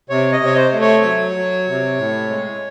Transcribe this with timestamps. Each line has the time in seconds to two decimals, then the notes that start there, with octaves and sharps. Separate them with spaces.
0.10 C3 C#5
0.32 D#5
0.41 C3
0.46 C#5
0.57 C5
0.73 A3
0.81 C#5
1.03 F#3
1.35 F#3
1.67 C3
1.98 A2
2.30 G#3